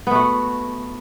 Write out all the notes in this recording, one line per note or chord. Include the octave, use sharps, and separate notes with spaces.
A3 B3 F#4